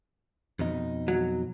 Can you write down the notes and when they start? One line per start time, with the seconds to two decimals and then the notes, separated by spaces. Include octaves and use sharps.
0.59 F2 B2 D#4
1.08 F#3